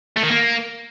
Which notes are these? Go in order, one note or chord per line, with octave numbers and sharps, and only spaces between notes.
A3
D#3
A#3